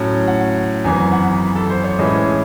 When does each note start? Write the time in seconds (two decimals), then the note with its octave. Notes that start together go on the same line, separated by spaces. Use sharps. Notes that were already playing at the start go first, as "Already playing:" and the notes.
Already playing: A2 F#3 C#4
0.28 F#5
0.84 G#1 F#2 E3 G#5
1.12 F#5
1.55 A4
1.70 C5
1.84 C#5
1.98 A2 E3 G#3 C#4 E4 D#5